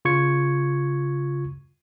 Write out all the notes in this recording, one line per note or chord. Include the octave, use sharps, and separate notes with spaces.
C#3 F4 C#6 G#6 C#7